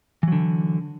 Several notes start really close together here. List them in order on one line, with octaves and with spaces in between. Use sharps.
E3 F#3 D3